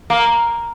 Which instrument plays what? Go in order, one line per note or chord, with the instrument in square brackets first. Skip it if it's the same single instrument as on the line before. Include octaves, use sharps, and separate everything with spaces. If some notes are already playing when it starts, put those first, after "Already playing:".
[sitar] A#3